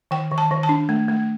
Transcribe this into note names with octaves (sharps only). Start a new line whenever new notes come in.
D#3 G5
D#3
A5
D#3
A5
D4
A3
A3